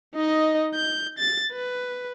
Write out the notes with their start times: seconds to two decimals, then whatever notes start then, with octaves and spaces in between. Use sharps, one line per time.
0.16 D#4 D#5
0.75 G6
1.19 A6
1.53 B4